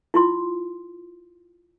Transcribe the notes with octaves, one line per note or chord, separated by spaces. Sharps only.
E4 F4 C6